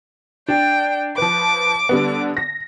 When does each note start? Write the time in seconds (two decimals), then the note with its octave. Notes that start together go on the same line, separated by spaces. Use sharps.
0.48 D4 G5
1.18 F3 B4 D6
1.89 D3 G3 B3
2.37 A#6